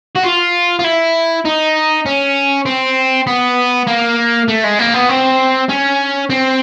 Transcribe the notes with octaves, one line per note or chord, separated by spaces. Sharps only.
F#4
F4
F4
E4
D#4
C#4
C4
B3
A#3
A3
G#3
A#3
B3
C4
C#4
C4